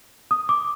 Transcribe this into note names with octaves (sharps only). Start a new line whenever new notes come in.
D#6
D6